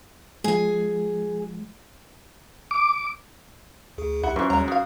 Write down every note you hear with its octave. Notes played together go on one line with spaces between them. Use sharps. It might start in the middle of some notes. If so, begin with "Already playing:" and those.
F3 G#3 G#4 G#5
D6
D2 G#4
C#2 E4 G4 F#5
F#2 E3 F3 C#6
D#2 G3 G#3 C#5 A#5
F#4 F5 D#6